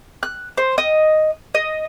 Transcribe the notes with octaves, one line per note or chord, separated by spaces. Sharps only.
F#6
C5
D#5
D#5